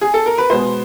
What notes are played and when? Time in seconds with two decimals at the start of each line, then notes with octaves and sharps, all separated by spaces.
0.01 G#4
0.14 A4
0.26 A#4
0.38 B4
0.50 B2 G#3 B3 C5